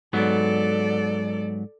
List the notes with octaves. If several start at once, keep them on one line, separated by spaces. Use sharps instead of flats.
G#2 F#3 B3 A4 D5